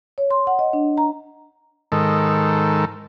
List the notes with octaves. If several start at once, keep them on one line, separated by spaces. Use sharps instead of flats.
C#5
C6
F#5
D#5
D4
A#5
G#2 D#3 A4